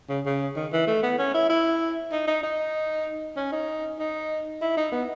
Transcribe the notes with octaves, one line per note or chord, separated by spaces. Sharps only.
C#3
C#3
D#3
E3
A3
B3
C#4
E4
E4
D#4
D#4
D#4
C#4
D#4
D#4
E4
D#4
B3